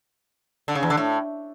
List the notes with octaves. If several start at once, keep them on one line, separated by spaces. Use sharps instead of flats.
D3
C#3
E2
D3
A2